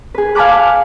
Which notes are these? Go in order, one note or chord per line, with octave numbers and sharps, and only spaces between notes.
G#4 B4
F5 G#5 A5 B5 D6 F#6